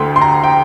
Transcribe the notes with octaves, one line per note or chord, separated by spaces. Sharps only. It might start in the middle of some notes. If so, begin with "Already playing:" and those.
Already playing: D2 D3 A3 G5 C6
C6
A#5
G5